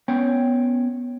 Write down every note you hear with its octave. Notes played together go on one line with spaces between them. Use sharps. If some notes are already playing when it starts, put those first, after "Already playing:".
B3 C#4 C#5 G5